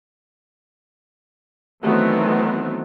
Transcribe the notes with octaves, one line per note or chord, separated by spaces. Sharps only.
D#3 E3 F#3 A3 B3 C4